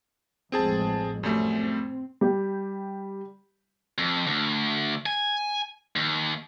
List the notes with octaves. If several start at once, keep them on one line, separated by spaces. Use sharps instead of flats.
A1 F2 G#3 C4 G#4 A5
F#2 G3 A3 C4
G3 G4
F2
D2
G#5
D#2